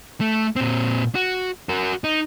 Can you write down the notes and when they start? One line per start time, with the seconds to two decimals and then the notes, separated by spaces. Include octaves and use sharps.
0.21 A3
0.56 A#2 C4
1.15 F#4
1.69 F#4 A#4
2.04 D#4